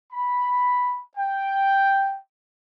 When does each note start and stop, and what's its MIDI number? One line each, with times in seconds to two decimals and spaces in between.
0.12 1.00 83
1.17 2.18 79